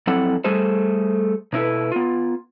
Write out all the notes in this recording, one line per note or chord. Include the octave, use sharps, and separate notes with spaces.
F2 F#3 C4 E4 A4 F#5
G3 A3 G#4 A4 C5
B2 D#4 E4 A4 B4
B3 F4